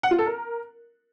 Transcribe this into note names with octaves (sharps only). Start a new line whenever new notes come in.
F#5
F4
A4
A#4